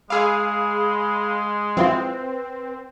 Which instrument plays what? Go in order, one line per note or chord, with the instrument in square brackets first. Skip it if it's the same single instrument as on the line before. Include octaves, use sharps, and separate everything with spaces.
[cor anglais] G#3 [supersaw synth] G#4 F5 [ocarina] B5 [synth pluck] D6 E6
[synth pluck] F3 E4 F4 [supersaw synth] C4 [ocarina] B4